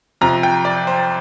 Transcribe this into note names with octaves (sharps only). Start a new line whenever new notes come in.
F2 C3 F3 A#5
G5
D5
C5